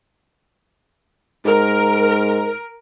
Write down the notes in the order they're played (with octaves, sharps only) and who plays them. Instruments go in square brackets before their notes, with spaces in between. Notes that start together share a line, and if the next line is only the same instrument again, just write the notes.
[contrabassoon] G#2 [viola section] A#4